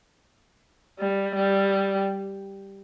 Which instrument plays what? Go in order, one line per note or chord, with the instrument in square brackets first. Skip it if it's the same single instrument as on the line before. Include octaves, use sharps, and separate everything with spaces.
[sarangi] G3
G3